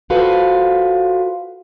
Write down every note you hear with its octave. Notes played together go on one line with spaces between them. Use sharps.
F4 F#4 A4 B4 C5 F5